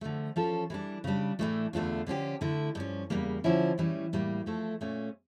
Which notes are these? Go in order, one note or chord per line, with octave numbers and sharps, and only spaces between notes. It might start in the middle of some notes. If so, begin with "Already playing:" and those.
D3 F3 A3
F3 C#4 F4 A4
E3 G3 D4
C#3 G3 D4
A2 E3 A3 D4
E2 D3 A3 D4 F4
D3 F3 C#4 G4
D3 A3 E4
G2 F3 C#4
E2 C#3 G3 A#3
D3 F3 C#4 E4
A2 E3 G3 C#4
A2 G3 A#3
F3 A3 E4 A4
A#2 A3 C#4